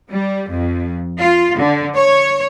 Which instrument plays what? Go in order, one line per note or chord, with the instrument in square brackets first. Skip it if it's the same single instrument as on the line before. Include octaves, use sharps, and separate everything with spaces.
[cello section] G3
F2
F4
D3
C#5